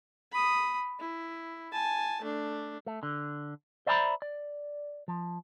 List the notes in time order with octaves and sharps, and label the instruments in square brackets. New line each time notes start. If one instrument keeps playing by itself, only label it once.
[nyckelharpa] B5 D#6
E4
G#5 A5
A3 D4
[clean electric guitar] A3
D3
C5 D5 E5 G#5 A#5 B5
D5
F3